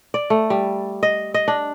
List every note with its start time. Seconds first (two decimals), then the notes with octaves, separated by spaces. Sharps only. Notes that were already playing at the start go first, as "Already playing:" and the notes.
0.14 D5
0.30 A3
0.50 G3
1.03 D#5
1.34 D#5
1.48 D4